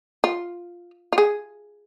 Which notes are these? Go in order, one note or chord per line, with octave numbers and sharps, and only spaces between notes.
F4
F4
G#4